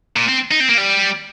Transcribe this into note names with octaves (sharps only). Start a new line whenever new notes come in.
A#2
C4
D#4
C4
A#3
G3